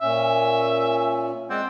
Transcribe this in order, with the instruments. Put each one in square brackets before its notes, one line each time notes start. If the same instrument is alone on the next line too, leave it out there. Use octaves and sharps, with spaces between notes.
[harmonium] A#2 C#4 [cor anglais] E5
[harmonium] G#3 D5 F#5 [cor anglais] C4